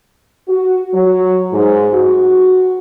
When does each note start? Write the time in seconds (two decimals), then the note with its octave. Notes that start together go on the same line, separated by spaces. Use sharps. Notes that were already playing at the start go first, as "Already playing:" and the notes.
0.48 F#4
0.93 F#3
1.52 G#2
1.94 F#4